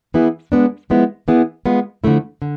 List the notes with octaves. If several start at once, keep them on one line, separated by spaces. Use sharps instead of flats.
E3 B3 E4 G#4
G#3 B3 D4
F3 G#3 B3 E4
E3 B3 E4 G#4
G#3 B3 F4
D3 F3 A3 E4
D3